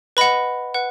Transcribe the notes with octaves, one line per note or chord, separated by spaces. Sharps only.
B4 D#5 F#5 B5
B4 F#5